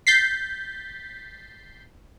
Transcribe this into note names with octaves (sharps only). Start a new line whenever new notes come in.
G6 A6 B6 C7